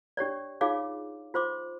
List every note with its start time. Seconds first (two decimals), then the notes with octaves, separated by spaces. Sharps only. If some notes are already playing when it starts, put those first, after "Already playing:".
0.17 D4 G4 C#5 D5
0.61 D#4 F4 G#4 C#5 F5 D6
1.34 F4 C5 C6 D6